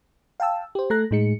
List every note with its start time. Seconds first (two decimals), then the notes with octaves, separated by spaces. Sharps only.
0.40 F5 G5 A5 E6
0.75 G4 C5
0.90 A3 A4 A#5 F#6 A#6
1.11 A2 G#3 D#4 G#4 C#7